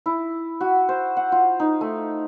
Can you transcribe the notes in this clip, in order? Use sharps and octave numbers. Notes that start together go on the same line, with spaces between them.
E4
F#4
C5
F#5
F4
D#4
A3